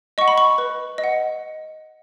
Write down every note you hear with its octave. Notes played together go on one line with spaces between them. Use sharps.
D#5 F#5 C#6
B5
C#6
B4
D#5
F#5